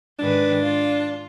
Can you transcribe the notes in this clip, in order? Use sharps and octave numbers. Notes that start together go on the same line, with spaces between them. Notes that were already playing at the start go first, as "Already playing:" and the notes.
G#2 D#3 D4 B4
F4